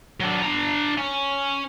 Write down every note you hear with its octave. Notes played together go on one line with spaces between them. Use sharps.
F#3 D4
D4 A#5
C#4